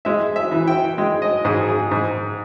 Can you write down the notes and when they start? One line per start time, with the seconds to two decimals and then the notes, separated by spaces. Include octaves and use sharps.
0.05 G#3 E5
0.36 E5
0.52 E3
0.68 G5
0.98 G#3
1.22 D#5
1.45 G#2 G#4
1.68 G#4
1.91 G#2